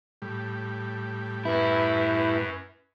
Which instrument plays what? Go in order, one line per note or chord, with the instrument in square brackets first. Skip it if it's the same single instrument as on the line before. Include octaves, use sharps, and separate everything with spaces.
[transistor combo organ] A2 G3
[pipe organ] F#2 [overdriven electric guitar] E4 [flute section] B4